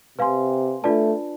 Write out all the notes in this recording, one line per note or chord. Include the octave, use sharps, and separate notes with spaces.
C3 B4 F5 G#5 C6
A3 D4 F4 B4 D5 A5